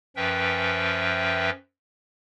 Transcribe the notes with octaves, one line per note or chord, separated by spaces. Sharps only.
F#2 F3 C#4 B4 E5 G5